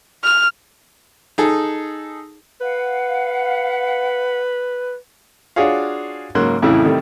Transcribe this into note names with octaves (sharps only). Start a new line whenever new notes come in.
F6
D#4 G#4 A4
B4 F5 F#5
D4 F4 F#4 G#4 C#5 F5
G#2 C#3 F#3 A#3 C6 F#6
F2 A2 C#3 E3 E4
C3 D#3 G3 A3